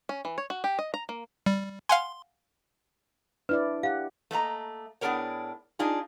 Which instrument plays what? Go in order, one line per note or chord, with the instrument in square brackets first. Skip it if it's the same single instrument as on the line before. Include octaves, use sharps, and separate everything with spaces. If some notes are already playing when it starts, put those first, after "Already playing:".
[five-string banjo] C#4
E3
C#5
F#4
G4
D#5
A#5
A#3
[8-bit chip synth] G3
[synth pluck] F5 F#5 G#5 [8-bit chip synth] C6
[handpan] D4 E4 D5 [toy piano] B4
[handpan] G4 F#5 [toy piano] F5
[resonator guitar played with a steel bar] A3 A#3 D#5 A#5
A2 B3 D4 G#4 A#4 C#5
D4 D#4 F4 G#4